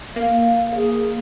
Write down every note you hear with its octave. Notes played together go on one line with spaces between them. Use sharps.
A#3 F5
G#4